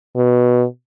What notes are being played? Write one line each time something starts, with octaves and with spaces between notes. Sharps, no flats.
B2